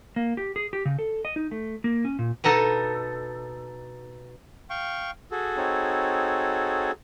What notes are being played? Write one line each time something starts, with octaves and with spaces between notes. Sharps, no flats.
A#3
G4
G#4
G4
C#3
A4
D#5
D#4
A3
A#3
C#4
A#2
B2 B3 D#4 A4
F5 G5 C#6
F#4 G#4 A4
C4 D#4 C#5